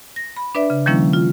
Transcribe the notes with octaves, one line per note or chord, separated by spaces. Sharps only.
A#6
B5
D4 B4 D5 E5
C#3
D#3 F3 G3 A#3 C#4 E4
F4